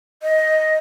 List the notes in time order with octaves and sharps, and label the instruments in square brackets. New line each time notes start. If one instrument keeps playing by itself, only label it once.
[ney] D#5